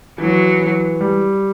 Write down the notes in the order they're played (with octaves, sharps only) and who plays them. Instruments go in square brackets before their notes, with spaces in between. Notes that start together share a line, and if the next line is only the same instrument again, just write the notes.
[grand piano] E3 [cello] F#3
[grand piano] E3
G3